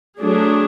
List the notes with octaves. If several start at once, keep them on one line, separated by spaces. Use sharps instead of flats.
F#3 A3 D4 G#4